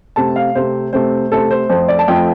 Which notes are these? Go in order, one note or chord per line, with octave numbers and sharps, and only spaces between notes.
C3 A3 C4 A5
F5
C3 A3 C4 C5
C3 A3 C4 C5
C3 A3 C4 A4
C5
F2 F3 A3 C5
D5
A5
F2 F3 A3 G5